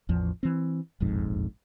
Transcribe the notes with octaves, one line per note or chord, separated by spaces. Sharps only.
A1 E2 F3
E3 C4
E1 A#1 F2 G#2